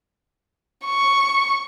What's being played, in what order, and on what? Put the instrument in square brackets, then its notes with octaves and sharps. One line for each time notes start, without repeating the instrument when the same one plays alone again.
[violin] C#6